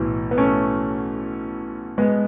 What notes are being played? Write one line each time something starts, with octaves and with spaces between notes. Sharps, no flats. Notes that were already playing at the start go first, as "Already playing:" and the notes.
Already playing: B1 A2 E3
B3
A3 C#4
G#3 B3